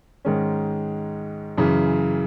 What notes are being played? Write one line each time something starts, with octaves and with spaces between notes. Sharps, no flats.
G#2 D#3 G#3 C#4
F#2 C#3 E3